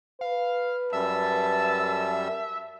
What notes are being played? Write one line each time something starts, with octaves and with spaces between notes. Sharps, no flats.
B4 F5
F#2 G3 E5 A5 E6